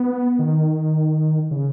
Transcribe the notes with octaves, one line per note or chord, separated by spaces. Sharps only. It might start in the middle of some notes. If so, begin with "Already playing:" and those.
Already playing: B3
D#3
C#3